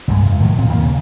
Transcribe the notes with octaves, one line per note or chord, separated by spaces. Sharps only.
C2 G2 G#3
F1 F2
A2 D#3 F3 F#3
B1 A#2 C4
D#2 A#3
C#3